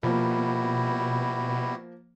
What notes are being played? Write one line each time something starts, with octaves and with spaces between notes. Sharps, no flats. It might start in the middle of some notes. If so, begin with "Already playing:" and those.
B2 F3 G3 A#3 E4 F#4